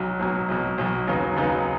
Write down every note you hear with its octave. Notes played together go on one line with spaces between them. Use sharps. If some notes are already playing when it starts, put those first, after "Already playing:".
Already playing: B1 F#3
B1 B2 F#3
B1 B2 F#3
B1 B2 F#3
D#2 C#3 F#3 B3 D#4
D#2 C#3 F#3 B3 D#4